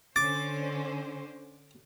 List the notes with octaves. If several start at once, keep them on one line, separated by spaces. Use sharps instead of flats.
D3 C#4 C5 D6 A6